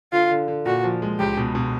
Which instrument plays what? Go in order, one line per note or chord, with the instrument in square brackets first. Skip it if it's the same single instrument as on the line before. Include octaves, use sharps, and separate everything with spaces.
[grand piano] D3 [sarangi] F4
[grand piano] D3
D3
[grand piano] A#2 [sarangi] F#4
[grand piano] F3
G#3
[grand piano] C#2 [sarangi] G4
[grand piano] B2
B2